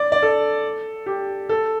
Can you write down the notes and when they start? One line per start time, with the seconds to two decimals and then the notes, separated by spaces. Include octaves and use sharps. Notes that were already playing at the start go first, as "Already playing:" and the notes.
Already playing: D5
0.12 D5
0.22 A4
1.06 G4
1.49 A4